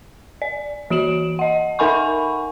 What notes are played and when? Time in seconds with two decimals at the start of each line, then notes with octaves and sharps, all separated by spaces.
0.42 D5
0.90 E3 F#4 D7 E7 F#7
1.39 D#5 F#5
1.79 D#4 A#4 F#5 G#5 B5 C#6